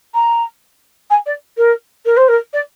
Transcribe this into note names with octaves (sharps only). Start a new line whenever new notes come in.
A#5
G#5
D5
A#4
A#4
C5
A#4
D5